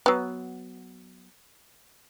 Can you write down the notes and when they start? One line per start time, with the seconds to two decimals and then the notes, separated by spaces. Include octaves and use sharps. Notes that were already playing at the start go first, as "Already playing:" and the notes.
0.06 F#3 B3